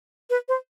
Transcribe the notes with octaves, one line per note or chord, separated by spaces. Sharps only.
B4
C5